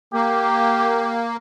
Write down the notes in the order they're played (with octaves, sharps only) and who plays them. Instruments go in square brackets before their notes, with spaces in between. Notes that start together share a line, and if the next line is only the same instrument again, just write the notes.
[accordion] A#3 [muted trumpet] G4